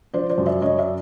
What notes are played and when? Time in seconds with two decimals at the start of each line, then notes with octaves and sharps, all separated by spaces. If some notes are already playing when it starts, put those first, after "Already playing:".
0.14 F3 C5 D5
0.30 C5 D5
0.38 F#2
0.46 D5 E5
0.62 F#2 C#5 D#5
0.78 D5 E5